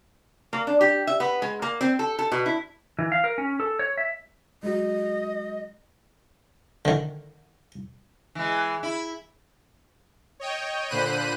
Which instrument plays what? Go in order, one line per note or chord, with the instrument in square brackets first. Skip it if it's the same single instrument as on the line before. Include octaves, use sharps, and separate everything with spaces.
[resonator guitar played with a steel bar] A#3
D4
G4
E5
B3
G#3
A#3
C4
A4
A4
B2
E4
[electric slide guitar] E3
F5
A#4
C#4
A4
C#5
E5
[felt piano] F#3 G#3 [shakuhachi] D#5
[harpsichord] D3 D#3
[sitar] E3 G#3
E4
[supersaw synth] C#5 D#5 G5
A#2 D3 C5 B5 F#6 D#7